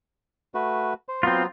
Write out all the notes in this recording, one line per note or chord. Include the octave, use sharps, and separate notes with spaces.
A3 F#4 B4
C5
F#3 B3 C4 F4